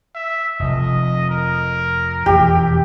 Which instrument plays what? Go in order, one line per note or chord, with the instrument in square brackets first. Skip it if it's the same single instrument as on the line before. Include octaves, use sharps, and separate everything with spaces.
[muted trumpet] E5
[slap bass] F1 F2 [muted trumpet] D#5
[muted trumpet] A#4
[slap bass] E1 F2 [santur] G4